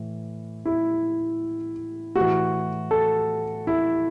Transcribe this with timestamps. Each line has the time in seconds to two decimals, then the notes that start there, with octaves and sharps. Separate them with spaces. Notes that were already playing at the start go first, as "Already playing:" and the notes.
Already playing: A2 E3
0.66 E4
2.15 A2 E3 F#4
2.91 A4
3.67 E4